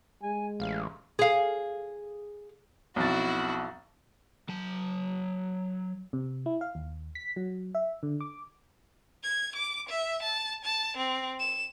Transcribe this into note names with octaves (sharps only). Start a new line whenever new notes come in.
G#3 G#5
A1 F5
G#4 F5
B1 F2 E4 F#4 A6
F#3 A5
C3
E4
F5
D#2
B6
F#3
E5
D3
D6
G#6
D6
E5
A5
A5
C4
E7